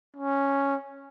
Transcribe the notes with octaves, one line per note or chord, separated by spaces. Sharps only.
C#4